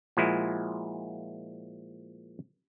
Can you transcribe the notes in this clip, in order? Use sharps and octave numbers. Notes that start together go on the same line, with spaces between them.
A#2 F3 G#3 E4 F#4